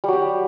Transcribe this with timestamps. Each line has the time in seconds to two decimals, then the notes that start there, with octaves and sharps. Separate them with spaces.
0.04 G3
0.08 F#3
0.13 G4